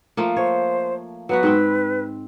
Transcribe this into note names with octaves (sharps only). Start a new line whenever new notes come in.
F3 A3 A#3
C5 C#5
F#3 B3 F#4 B4
G#2 C4 G5